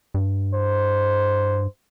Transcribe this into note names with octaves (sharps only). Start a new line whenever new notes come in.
G2
C5